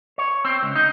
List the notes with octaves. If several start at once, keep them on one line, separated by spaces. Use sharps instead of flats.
C#5
C4
C#2
D#4